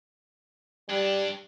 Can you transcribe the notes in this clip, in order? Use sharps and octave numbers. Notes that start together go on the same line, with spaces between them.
G2 G3 D4